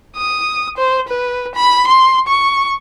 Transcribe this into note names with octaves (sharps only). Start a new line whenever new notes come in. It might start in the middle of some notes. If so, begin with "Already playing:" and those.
D#6
C5
B4
B5
C6
C#6